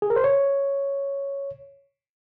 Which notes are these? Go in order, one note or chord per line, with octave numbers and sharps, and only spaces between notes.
G#4
A#4
C5
C#5